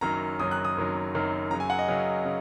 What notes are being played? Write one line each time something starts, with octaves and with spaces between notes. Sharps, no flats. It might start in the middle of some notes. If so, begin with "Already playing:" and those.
F#1 F#2 D#3 F#3 A#5
F#1 F#2 D#3 F#3 D#6
F#6
D#6
F#1 F#2 D#3 F#3
F#1 F#2 D#3 F#3
F#2 C#3 F#3 A#5
G#5
F#5
D#5
F#2 C#3 F#3
C#3